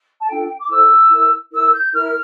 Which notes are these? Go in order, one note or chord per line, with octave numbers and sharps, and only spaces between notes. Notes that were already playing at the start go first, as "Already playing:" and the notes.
A5
D4 F4 A4 G5
G5
D6
E4 A4 C5 E6
E4 A#4
E4 A#4 E6
G6
E4 A#4 F6